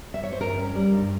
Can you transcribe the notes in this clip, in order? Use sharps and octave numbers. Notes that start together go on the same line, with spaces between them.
E5
C#5
C5
G2 A#4
C#4
G3
G2